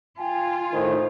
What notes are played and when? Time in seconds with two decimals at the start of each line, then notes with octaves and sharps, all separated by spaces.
0.19 F4 G5 G#5
0.73 A2 D#3 C5